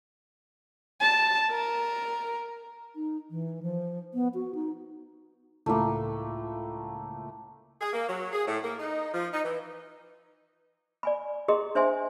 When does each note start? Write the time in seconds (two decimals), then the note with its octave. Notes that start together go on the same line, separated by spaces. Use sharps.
1.01 A5
1.51 A#4
2.96 D#4
3.31 E3
3.63 F3
4.14 B3
4.34 F#4
4.55 D#4
5.66 C#2 A2 A3 A#3
7.80 G#4
7.93 A#3
8.07 F#3
8.33 G#4
8.46 A2
8.64 A#3
8.79 D#4
9.13 F3
9.33 D#4
9.44 E3
11.03 D5 G#5 B5
11.48 E4 G#4 A#4 D#5 C6
11.75 D4 C5 E5 G#5 C6